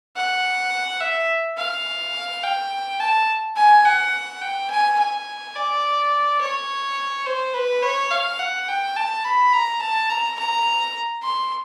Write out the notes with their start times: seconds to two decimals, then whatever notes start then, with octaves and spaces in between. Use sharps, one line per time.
0.16 F#5
1.01 E5
1.58 F5
2.43 G5
3.00 A5
3.57 G#5
3.85 F#5
4.42 G5
4.70 G#5
4.99 G#5
5.56 D5
6.41 C#5
7.26 C5
7.54 B4
7.83 C#5
8.11 F5
8.39 F#5
8.68 G5
8.96 A5
9.24 B5
9.53 A#5
9.81 A5
10.10 A#5
10.39 A#5
11.23 C6